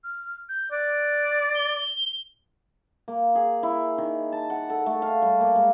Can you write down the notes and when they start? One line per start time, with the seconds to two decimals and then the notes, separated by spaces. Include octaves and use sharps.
0.04 F6
0.49 G6
0.72 D5 F#6
1.55 G7
3.08 A#3
3.35 G#4
3.63 E4
3.98 D#3
4.32 A5
4.50 F#5
4.70 A4
4.86 A3
5.02 F5
5.22 G3
5.40 A#3
5.56 G#3